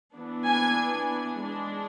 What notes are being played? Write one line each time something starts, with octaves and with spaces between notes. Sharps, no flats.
E3 B3 D4
G#5
G#3 D4